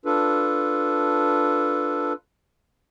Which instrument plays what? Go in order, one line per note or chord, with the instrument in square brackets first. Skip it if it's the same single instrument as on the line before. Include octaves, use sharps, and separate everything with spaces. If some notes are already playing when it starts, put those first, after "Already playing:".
[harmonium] D4 F4 A4 B4